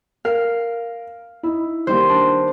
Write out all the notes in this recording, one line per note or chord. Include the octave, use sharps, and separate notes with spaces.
A#4 F5
D#4 E4
D#3 G3 A#3 C5
D4